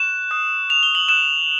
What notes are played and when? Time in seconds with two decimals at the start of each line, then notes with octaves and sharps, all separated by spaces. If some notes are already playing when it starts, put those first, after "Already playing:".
Already playing: C#6 F#6 E7
0.31 D#6 F#6
0.70 F7
0.83 G7
0.95 F#7
1.08 D#6 F#6 E7